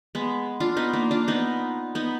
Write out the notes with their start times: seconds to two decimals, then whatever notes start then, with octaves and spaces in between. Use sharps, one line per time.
0.15 G#3 B3
0.60 D4 F4
0.77 B3 D#4
0.93 A#3 D4
1.11 D4 F4
1.28 B3 D#4
1.95 B3 D#4